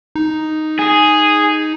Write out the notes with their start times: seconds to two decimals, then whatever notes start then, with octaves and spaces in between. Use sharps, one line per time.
0.15 D#4
0.79 G#4